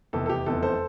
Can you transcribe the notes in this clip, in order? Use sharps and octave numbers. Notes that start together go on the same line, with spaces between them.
F1 E2 C3 A4
A4
G4
F1 E2 C3 A4
A4 C5